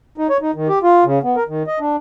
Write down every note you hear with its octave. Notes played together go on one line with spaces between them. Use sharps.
D#4
C#5
D#4
D#3
G4
F4
C#3
B3
A#4
D#3
D#5
D4